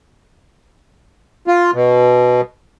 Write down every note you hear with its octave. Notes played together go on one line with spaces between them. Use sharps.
F4
B2